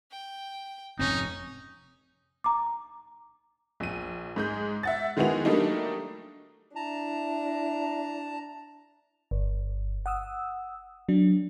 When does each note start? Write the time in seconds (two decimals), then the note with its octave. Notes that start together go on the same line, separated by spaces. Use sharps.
0.11 G5
0.99 F1 G#2 C4 C#4 D#4
2.44 A#5 D6
3.80 A#1 D#7
4.36 G#2 G#3 G6
4.83 E5 F#5 A6
5.17 D#3 G#3 B3 E4 F#4 F7
5.45 F#3 G3 A3 A#3 D4 D#4
6.75 D4 E4 A5 A#5
9.31 G1
10.06 F#5 D#6 E6
11.09 F#3 D4